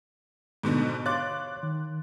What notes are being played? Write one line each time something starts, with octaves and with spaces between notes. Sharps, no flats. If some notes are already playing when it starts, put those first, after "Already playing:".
G#2 B2 D3
C#5 F5 C6 D6 F#6 A6
D#3